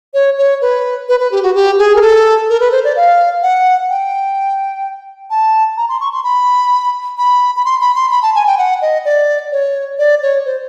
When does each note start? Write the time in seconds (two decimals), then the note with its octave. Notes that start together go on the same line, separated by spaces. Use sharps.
0.14 C#5
0.38 C#5
0.62 B4
1.09 B4
1.20 B4
1.32 G4
1.43 F#4
1.55 G4
1.79 G#4
1.96 A#4
2.02 A4
2.49 A#4
2.60 B4
2.72 C5
2.84 D5
2.96 F5
3.43 F#5
3.89 G5
5.30 A5
5.77 A#5
5.89 C6
6.01 C#6
6.13 C6
6.24 B5
7.18 B5
7.56 B5
7.65 C6
7.81 B5
7.96 C6
8.11 B5
8.23 A5
8.35 G#5
8.47 G5
8.58 F#5
8.82 D#5
9.05 D5
9.52 C#5
9.99 D5
10.22 C#5
10.45 C5